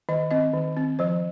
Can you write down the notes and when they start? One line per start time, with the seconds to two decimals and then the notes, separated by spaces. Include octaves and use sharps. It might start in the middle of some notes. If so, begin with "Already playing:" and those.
0.09 D#3 D#5
0.31 C4 D#5
0.53 D#3
0.77 C4
0.99 F3 C5